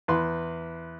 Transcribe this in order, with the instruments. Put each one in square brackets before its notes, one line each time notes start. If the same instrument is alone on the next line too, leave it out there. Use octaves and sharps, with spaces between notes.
[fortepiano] E2 B4 C6